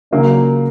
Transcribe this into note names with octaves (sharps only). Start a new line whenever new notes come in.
C#3 F#3 A#3 D4